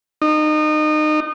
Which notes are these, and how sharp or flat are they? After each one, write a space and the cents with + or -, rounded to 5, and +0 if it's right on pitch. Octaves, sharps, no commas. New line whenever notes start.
D#4 -30